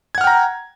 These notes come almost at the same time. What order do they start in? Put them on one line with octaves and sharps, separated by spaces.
G#6 F#5 F6 G5 A#5